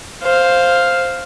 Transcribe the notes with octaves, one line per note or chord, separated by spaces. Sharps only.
C5 F5